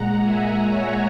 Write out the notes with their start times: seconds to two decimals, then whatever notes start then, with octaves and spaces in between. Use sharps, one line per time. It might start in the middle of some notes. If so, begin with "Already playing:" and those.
Already playing: A#2 G#3 F#5 A#5
0.20 E5 G#5
0.66 C#5 E5